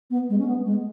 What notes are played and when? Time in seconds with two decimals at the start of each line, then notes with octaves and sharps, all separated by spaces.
0.10 B3
0.29 G#3
0.39 C#4
0.47 B3
0.65 G#3